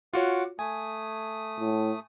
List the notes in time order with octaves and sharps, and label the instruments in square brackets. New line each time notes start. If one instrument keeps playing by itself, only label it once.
[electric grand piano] F4 F#4 C#5 [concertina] F#5 D6
[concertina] A3 D#6 [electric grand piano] G#5
[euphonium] A2